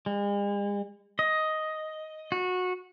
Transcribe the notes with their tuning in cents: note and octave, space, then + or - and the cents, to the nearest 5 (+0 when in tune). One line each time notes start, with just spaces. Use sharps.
G#3 -45
D#5 +5
F#4 -20